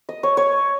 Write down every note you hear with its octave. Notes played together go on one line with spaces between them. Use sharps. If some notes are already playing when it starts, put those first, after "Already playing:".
D#5
C#5
C#5